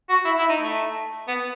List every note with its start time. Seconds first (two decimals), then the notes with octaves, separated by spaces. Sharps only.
0.09 F#4
0.25 E4
0.39 E4
0.49 D#4
0.59 A3
1.28 B3